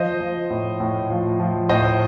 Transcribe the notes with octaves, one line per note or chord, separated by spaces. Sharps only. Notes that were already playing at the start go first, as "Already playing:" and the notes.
Already playing: F3 C5 D#5
F3
A2
A2
F3
F3
A2 C5 D#5